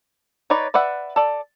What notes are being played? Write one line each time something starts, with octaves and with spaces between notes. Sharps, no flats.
D#4 B4 C#5 D5
B4 D5 E5 F#5
A4 D5